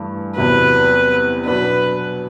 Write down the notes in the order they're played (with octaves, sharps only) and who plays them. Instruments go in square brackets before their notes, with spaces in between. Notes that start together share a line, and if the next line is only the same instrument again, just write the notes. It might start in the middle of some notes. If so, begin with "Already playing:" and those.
Already playing: [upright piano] G2 E3 A3 E4
[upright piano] E2 C3 F#3 [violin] B4
[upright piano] B2 F#3 B3 D4 [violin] B4